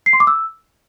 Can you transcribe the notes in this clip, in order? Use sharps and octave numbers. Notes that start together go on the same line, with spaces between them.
C7
C6
D6
E6